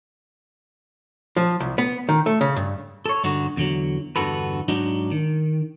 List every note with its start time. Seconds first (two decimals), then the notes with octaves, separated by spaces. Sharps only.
1.36 F3
1.60 C2
1.78 B3
2.09 D#3
2.26 A3
2.41 C#3
2.56 G2
3.06 A4 C#5
3.24 G2 D3 D#4 F#4
3.57 E2 D3 F#3
4.16 E2 G2 D3 F#4 A4 B4
4.68 G#2 F#3 D4 D#4
5.11 D#3